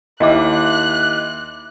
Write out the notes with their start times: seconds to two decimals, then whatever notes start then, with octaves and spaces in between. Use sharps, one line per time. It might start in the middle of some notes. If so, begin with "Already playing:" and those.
0.20 D#2 E4 D#5 E5 D6 F#6